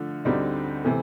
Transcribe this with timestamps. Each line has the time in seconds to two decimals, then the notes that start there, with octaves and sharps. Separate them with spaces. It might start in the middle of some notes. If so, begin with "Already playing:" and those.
Already playing: D3 F3 A3
0.25 D2 D3 G3 C4 D#4
0.84 C3 E3 A3